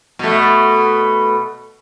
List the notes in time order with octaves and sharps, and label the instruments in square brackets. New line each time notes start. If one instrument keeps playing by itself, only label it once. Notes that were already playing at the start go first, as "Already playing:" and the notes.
[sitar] B2 A3